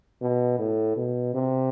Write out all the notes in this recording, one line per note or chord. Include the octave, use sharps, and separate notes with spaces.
B2
A2
B2
C3